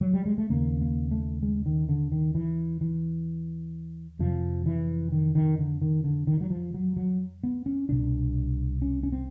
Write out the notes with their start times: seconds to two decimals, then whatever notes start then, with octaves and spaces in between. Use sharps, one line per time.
0.01 F#3
0.14 G3
0.26 G#3
0.38 A3
0.50 D#2 C#3 A#3
0.81 A#3
1.11 A3
1.43 G#3
1.66 D#3
1.89 D3
2.12 D#3
2.35 E3
2.81 E3
4.19 F2 C3 F3
4.66 E3
5.12 D#3
5.35 D#3
5.59 D3
5.82 D#3
6.04 D3
6.27 D#3
6.41 F#3
6.50 F3
6.74 F#3
6.97 F#3
7.43 B3
7.66 C#4
7.89 C2 B2 D4
8.82 C#4
9.03 C#4
9.12 C4